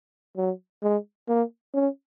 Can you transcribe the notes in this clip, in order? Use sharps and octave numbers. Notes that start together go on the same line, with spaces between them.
F#3
G#3
A#3
C#4